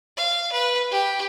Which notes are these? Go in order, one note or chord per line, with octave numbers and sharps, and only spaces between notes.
F5
B4
G4